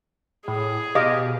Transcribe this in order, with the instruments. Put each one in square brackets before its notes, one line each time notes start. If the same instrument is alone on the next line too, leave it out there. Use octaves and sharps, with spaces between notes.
[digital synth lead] A2 [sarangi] G#4
[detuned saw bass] B2 [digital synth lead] G4 [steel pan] D#5 F5 D6